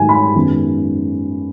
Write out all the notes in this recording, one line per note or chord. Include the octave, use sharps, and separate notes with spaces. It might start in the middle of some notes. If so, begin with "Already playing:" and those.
Already playing: G#2 D#3 F#3 A3 G#5
B5
F#2 D#3 G#3 B3